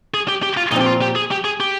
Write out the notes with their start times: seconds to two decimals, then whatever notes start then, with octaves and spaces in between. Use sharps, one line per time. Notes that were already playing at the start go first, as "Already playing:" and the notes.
0.14 G#4
0.28 G4
0.43 G4
0.57 F4
0.71 A#2 F3 C4 D#4
0.81 G4
0.86 F4
1.02 G4
1.16 G#4
1.31 G4
1.45 G#4
1.60 G4